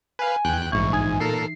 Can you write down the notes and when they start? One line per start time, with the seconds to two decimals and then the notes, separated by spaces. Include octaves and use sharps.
0.19 B4 F5 G#5
0.45 E2 G5 F#6
0.72 A#1 G#2 E3 C#6
0.93 D#4 G#5 G#6
1.20 A#2 A4 A#4 C7